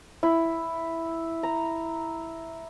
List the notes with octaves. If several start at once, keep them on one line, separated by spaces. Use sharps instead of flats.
E4
A#5